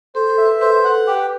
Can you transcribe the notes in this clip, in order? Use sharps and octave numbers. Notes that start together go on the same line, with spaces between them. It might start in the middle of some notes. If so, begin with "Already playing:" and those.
A4 C5
A4
E5
B4
B4 C5
A4 F#5
G4 B4